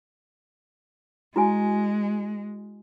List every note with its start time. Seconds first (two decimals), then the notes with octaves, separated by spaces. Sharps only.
1.36 G#3 E4 F#4 G#5